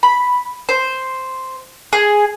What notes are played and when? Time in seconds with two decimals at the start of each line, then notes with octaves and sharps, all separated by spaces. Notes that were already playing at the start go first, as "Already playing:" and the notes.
0.03 B5
0.69 C5
1.93 G#4